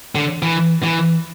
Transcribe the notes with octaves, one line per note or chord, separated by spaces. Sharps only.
D3
E3
E3